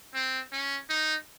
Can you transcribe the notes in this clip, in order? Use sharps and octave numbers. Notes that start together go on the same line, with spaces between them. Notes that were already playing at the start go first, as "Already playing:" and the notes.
C4
C#4
D#4